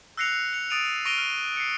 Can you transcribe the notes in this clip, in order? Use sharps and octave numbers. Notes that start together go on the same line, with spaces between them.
E6 F#6 A#6 C7 C#7 F7
C#7 F7
D#6 A6 D7 D#7 F7
C#6 A#6 D7 D#7 F7 G7
F6
C7 C#7